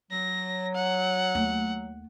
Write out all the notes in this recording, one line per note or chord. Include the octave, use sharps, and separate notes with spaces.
F#3 A#6
F#5
D#2 A3